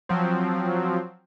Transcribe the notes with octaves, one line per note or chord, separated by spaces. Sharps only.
F3 F#3 C4